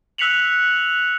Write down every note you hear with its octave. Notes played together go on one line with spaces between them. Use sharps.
E6 F#6 B6 C#7 F7 F#7